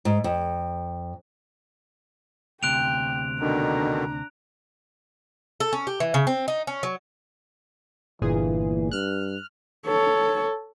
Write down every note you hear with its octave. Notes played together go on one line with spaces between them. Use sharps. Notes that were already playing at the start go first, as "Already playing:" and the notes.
G#2
F2
D2 C3 G5 F#6 D7 F7
B2 D3 D#3 D4 A#5
A4
C#4
G4
E3
C#3
C4
D#4
C#4
F#3
G1 A#2 E3 G#4
G2 F6 F#6
A4 C#5